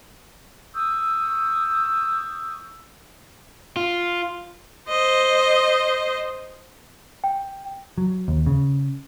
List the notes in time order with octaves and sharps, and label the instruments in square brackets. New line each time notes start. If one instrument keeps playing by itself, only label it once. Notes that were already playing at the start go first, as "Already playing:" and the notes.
[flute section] C#6 D#6 E6 G6
[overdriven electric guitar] F4
[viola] C5 D#5
[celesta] G5
[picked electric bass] F#3
D#2
C#3